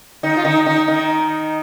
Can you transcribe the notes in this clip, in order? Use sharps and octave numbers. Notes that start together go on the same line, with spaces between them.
D#3 D#4
F4
D#3 D#4
D#3 D#4
D#3 D#4